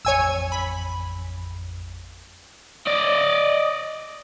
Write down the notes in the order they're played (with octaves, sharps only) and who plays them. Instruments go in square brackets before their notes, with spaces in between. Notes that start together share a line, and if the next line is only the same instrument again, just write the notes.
[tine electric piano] A1 F2 [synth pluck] C#5 G#5 E6
[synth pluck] B5
[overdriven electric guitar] D5 D#5